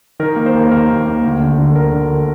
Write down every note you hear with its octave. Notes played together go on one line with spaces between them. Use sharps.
D#3 A#4
A#3
C5
D#2
D#3 A#4
D#2
A#3
D2
D3
D3
D2 A#4
D3